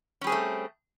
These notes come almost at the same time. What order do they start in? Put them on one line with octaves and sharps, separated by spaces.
C#4 G3 G#4 C4 A3